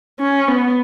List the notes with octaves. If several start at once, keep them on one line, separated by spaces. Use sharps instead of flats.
C#4
B3